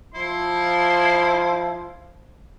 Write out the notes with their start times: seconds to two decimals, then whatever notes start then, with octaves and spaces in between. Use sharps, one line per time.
0.15 F3 E4 C6